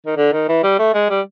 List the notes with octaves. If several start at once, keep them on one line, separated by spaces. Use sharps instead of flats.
D#3
D3
D#3
E3
G3
A3
G#3
G3